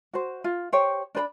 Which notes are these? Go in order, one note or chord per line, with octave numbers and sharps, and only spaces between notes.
F#4 C5
F4
G4 C5 C#5 G5
D4 B4 B5